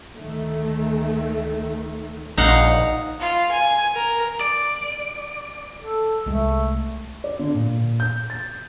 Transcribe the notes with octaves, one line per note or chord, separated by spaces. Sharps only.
D2 D#3 A3
A#1 D#4 F5 F#5
F4
G#5
A#4
D5
A4
C2 G#3 A3
D5
D3
A#2
G6
A6